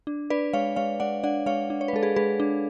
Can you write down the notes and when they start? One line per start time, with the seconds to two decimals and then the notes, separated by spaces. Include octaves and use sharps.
0.07 D4
0.30 D4 B4 D5
0.53 G#3 C#5 F5
0.76 G#3 C#5 F5
1.00 G#3 D5 F#5
1.23 D4 D5 F#5
1.46 G#3 C#5 F5
1.70 D4
1.81 C#5
1.88 B4
1.93 G#3 A4
2.03 G#4 B4
2.16 G#3 G#4 B4
2.40 D4